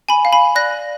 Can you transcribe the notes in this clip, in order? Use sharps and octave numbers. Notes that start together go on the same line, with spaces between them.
G#5 B5
F5
G#5 B5
D5 F#6 A#6